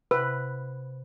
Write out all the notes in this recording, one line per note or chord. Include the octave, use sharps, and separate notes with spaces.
C3 B4